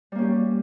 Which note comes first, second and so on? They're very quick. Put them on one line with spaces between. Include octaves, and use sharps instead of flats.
G3 A#3 C#4 G4